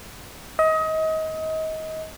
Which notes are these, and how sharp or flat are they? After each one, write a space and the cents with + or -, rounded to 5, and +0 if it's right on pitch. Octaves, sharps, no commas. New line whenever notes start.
D#5 +30